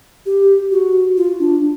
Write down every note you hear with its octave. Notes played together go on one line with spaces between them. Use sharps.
G4
F#4
F4
D4